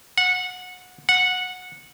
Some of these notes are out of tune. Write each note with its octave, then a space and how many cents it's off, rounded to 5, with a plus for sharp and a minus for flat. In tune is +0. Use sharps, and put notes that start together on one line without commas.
F#5 -20
F#5 -15